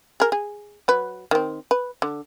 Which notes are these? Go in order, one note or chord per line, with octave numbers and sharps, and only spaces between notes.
G#4 A#4
G#4
F#3 B4
D#3 C4
B4
D3